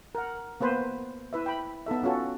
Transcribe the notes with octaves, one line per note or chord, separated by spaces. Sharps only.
A#4 F#5
A#3 B3 B4 C5
E4 B4 E5
G5 B5
B3 D#4 A4 E5
C#4 F4 F#4 A4